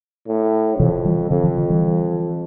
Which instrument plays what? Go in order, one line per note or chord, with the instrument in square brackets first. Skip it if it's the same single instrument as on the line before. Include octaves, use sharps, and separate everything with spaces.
[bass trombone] A2
[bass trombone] F2 [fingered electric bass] C3 E3
[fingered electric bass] E3 G3
[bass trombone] F2 [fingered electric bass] D3 F3
[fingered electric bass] D3 F3
D3 F3
E3 G3